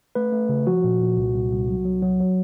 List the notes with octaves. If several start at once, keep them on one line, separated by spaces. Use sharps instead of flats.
A3 B4
A3
C#3
F3 F#4
A#2
A#2
C2
C2
C2
F#3
F#3
F#3
F#3